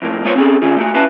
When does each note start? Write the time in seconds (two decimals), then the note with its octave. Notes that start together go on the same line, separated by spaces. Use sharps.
0.02 F2 A2 A#3
0.24 G#3 A#3 B3 F4 C5 C#5
0.36 C4 C#4 G#4 A4
0.62 D#3 C#4 F4 G#4
0.76 A3 A#3 F#4
0.94 C#4 E4 F#4 B4 F5 A5